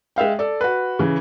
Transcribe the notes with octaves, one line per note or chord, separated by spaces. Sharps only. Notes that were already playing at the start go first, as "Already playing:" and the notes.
G#3 E5 F5 G5
A4 D5
F#4 B4
C#3 E3